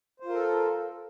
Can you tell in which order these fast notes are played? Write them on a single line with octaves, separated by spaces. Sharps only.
C5 F4 A#4 A4